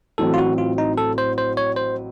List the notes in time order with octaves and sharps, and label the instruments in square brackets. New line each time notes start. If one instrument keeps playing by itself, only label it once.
[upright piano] A1 A2 F#3 C4 [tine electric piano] A4
[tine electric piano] F4
F#4
F4
D#4
A4
C5
C5
C#5
C5